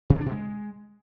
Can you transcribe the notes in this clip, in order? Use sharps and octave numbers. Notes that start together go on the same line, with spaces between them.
C3
D3
D4
B2
G#3